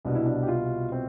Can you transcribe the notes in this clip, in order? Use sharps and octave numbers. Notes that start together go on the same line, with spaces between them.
C2 B2 D4
E4
D4
G4
F4
C4